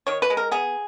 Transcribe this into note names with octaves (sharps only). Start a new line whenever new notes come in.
D#3 C#5
B4
G#3
A#4
B3 G#4